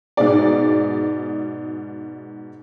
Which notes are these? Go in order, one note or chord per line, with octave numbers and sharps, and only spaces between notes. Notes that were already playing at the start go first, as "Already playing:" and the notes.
G#2 B2 G#4 D5